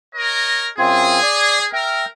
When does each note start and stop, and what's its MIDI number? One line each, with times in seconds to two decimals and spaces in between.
0.15 0.68 70
0.15 0.68 73
0.15 0.68 75
0.79 1.20 42
0.79 1.20 60
0.79 1.20 65
0.79 1.68 68
1.22 1.58 74
1.73 2.05 70
1.73 2.05 76
1.73 2.05 79